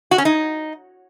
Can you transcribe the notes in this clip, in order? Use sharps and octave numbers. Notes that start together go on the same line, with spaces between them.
F#4
C#4
D#4